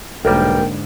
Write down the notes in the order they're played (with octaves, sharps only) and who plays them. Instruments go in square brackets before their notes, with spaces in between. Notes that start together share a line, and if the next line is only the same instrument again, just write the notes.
[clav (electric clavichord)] B1 G3 [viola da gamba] G#2 D3 [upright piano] A#3 A#4 [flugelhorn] G5